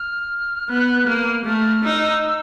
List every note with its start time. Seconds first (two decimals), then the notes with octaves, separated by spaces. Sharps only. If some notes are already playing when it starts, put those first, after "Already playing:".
Already playing: F6
0.69 B3 F#6
1.07 A#3 F6
1.45 A3 F6
1.84 D#4 E6